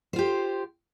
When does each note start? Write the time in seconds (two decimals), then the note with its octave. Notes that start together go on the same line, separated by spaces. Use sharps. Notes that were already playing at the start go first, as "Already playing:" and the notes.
0.13 C5
0.16 F4
0.19 G4